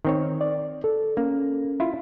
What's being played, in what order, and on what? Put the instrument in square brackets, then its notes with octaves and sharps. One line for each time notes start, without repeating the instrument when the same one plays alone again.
[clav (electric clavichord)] D#3 C4 C#5
[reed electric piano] D5
A4
[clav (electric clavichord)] A#3 [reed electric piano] C#4
[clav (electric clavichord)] E4 F4